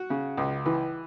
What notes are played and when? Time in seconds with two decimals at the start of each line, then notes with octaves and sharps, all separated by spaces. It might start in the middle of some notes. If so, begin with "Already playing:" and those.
Already playing: F#4
0.10 C#3
0.38 C#2
0.66 E3